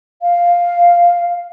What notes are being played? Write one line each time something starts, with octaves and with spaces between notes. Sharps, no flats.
F5